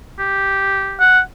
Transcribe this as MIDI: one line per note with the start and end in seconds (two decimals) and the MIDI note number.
0.19 1.00 67
1.00 1.20 78